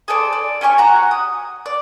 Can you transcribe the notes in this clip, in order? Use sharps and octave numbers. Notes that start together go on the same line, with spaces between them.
G#4 A4 C5 D5
D5
C#4 G4 G#5 C#6
F#4 F#5 A#5
D#6
D5